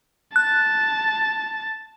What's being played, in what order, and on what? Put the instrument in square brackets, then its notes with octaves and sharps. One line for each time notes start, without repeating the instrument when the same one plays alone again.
[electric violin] A5 A6 [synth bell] F#6